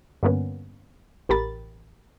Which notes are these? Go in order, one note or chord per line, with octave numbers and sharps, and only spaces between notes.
G2 D3 A#3 B3 C#4
A1 G4 A#4 B5 A6